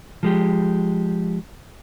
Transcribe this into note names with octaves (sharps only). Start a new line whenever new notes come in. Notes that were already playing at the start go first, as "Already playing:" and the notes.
F3 G#3 G4